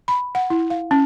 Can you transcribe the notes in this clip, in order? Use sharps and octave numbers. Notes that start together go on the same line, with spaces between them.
B5
F#5
E4
F5
C#4